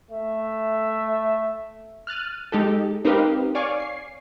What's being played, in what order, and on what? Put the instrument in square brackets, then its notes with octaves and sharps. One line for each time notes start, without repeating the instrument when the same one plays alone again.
[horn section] A3 E5
[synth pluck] F6 F#6 A6 D#7
G#3 D#4 G4 A4
C4 D#4 G4 A#4 B4 F5
C#5 D5 F5 G#5 C#6 D6
C7